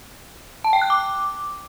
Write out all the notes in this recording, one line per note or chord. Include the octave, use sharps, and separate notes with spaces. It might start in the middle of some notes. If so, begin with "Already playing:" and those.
A5
G5
F#6
D6